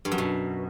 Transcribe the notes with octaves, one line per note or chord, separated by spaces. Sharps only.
G2
F#2
B2